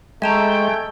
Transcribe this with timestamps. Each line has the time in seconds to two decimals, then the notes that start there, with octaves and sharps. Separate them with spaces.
0.22 G#3 A3 E5 G5 A5 A#5